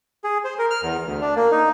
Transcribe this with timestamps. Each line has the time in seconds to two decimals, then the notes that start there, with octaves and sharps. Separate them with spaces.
0.24 G#4
0.44 C5
0.59 A#4
0.70 F6
0.83 E2
1.06 D2
1.21 D4
1.36 A#3
1.51 D#4